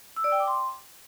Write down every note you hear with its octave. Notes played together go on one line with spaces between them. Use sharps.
E6
D5
G5
D6
C6